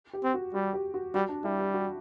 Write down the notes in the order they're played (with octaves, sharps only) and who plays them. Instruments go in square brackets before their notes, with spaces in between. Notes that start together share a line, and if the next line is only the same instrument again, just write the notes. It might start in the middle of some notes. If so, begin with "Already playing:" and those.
[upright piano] G4
[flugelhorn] C4
[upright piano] F#4
[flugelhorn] G3 [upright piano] F#4
[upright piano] G4
F#4
[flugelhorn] G3 [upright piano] F#4
[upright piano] D4
[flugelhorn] G3 [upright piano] E4
[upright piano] G4
F#4